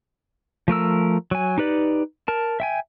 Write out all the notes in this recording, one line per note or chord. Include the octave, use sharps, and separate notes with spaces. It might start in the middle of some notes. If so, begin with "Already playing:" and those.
F3 A3 A#4 E6
F#3 G#5
D#4 G4 B4 D5
A#4 A5
E5 G5 G#5